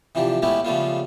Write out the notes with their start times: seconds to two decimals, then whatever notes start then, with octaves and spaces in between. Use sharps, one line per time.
0.15 C3 E3 F3 D4 G4
0.42 G#3 A3 B3 C#4 E4 G4
0.65 C#3 F3 G3 A3 B3 F4